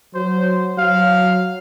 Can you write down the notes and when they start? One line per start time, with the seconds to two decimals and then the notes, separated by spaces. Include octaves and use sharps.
0.15 F#3 C5
0.78 F#3 F5